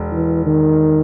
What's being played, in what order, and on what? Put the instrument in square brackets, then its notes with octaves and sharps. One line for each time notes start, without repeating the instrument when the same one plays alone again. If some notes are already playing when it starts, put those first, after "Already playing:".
Already playing: [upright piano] E1
[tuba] E3
D#3